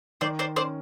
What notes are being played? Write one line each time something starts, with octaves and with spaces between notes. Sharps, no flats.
D#3 C5 D5
C5 D5
C#4 C5 D5